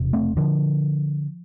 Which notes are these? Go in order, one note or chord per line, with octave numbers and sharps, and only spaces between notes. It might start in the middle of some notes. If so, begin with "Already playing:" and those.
Already playing: E1 C3
A3 C4
D3 F3